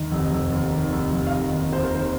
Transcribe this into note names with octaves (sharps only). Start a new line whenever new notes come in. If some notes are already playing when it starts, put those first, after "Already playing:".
Already playing: D#2 D#3 D#5
F1
F1
D#2
D#3
F1
F1
F5
D#3 D#5
D#2
D#2 C5
A#4
D#3 C5